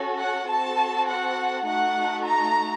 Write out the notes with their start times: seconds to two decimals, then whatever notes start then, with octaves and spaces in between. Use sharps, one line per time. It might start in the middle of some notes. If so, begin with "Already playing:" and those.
Already playing: C#4 F#4 A4
0.19 F#5
0.49 C4 F#4 A4 A5
1.08 F#5
1.67 A3 D#4 F#4 A4 F#5
2.27 A#5